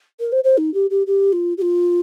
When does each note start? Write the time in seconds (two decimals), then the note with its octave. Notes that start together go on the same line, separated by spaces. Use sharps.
0.20 A#4
0.32 C5
0.44 C5
0.57 D#4
0.74 G4
0.90 G4
1.07 G4
1.32 F4
1.57 G4
1.62 F4